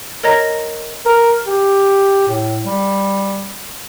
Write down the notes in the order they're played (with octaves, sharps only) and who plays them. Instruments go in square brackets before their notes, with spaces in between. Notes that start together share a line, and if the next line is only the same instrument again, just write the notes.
[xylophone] A#4 C#5 D#5 A#5 A#6
[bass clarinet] A#4
G4
A2
G3